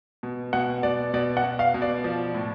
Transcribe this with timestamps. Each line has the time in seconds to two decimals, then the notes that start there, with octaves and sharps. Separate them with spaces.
0.23 B2
0.53 B2 F#5
0.83 B2 D5
1.14 B2 D5
1.37 F#5
1.44 B2
1.59 F5
1.74 B2
1.82 D5
2.04 F3
2.34 A2